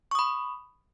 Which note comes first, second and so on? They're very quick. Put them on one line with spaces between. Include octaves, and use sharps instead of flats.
C#6 D#6 B5